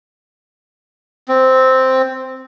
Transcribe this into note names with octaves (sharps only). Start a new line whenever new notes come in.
C4